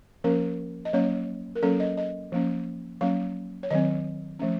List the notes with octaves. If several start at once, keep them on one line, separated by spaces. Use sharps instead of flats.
F3 A#3 C#4 A#4
D#5
F#3 A#3 C#4 C#5
A#4
F#3 A#3 C#4 A4
D#5
D#5
F3 A#3 C#4
F#3 A#3 C#4 F5
C#5
D#3 F#3 C4 D#5
F3 A3 C#4